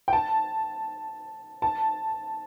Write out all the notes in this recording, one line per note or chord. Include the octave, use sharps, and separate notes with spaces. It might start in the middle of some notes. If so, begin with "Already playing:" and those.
G5
A5
A5